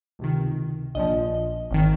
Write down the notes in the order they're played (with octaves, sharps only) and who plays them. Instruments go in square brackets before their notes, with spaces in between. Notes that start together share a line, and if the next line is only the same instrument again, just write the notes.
[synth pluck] C#2 C3 D#3
A#1 A#2 F3 D#5
G#1 D#3